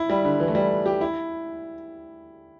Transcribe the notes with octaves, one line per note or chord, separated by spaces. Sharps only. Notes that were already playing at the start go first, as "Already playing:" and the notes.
Already playing: E4
G3
D3
E3
A3
G3
G4
E4